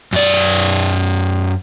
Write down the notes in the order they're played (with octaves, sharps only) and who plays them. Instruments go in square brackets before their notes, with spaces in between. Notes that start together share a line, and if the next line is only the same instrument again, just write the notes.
[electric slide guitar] F#2 D5